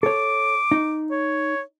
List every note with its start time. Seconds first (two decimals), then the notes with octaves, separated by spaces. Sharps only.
0.03 A4 C#5 D6
0.72 D#4
1.11 C#5